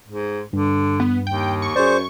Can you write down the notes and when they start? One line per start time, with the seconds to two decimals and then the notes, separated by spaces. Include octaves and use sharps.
0.08 G#2
0.53 G2 D3
1.00 B3
1.27 D#2 G5
1.62 C#6
1.76 F#2 G#4 C5 D5